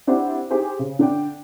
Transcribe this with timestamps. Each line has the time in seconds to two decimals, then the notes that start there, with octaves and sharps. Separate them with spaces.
0.07 C4 D4 E4 G4 C5 F#5
0.50 D#4 G4 G#4 C5
0.79 C#3
0.99 D3 D4 G5